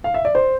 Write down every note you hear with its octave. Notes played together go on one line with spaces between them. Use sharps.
F5
E5
D5
C5